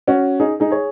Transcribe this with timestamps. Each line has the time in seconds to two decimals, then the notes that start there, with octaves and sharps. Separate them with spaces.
0.07 C#4 F#4
0.40 D#4 G#4
0.60 D#4 G#4
0.71 G#4 C#5